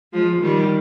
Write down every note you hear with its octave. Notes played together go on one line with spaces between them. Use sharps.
F3 G#3
D#3 G3